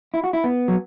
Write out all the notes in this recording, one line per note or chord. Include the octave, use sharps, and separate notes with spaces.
E4
F#4
E4
B3
F#3